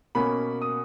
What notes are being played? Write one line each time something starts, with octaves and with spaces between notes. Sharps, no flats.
B2 A#3 C#4 B5
D#6